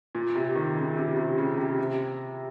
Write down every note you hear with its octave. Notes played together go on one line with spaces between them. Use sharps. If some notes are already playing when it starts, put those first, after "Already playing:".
A#2
C3
D#3
C#3
C3
C3
C#3
C3
C3